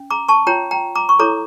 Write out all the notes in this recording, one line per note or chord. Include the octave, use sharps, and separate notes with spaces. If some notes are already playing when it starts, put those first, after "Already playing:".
Already playing: C#4
A#5 D6
A5 C#6
F4 C#5 G5 A#5
G5 A#5
A#5 D6
C#6
E4 A4 C#5 A#5 D6